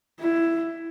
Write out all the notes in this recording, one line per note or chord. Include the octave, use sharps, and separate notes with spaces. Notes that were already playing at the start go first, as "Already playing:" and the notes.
E4